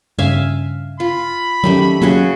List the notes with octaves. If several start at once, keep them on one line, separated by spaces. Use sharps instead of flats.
G2 C#3 E5 F5 G#5
F4 B5
D#3 F#3 G3 A3 C#4
C#3 F#3 A#3 C#4 F#4 G#4